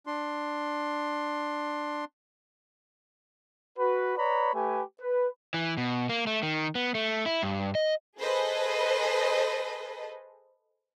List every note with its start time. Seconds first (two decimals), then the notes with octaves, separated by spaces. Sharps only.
0.07 D4 C6
3.78 F#4 B4
4.16 B4 C#5 D5 A#5 B5
4.53 A3 G4 B4 G#5
4.99 B4
5.54 E3
5.77 B2
6.09 A#3
6.27 A3
6.43 D#3
6.75 B3
6.95 A3
7.26 E4
7.43 G2
7.75 D#5
8.18 G#4 A4 B4 C5 D#5